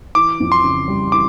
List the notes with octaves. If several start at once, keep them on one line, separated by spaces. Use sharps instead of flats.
E3 D6
F2
C6
C#3
G3
E3 D6